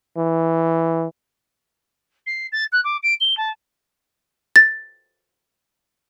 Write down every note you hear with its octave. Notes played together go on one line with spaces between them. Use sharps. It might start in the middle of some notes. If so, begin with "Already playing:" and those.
E3
C7
A6
F#6
D6
D7
G7
A5
A6